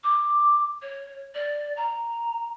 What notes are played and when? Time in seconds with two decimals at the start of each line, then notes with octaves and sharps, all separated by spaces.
0.03 D6
0.82 C#5
1.34 D5
1.77 A#5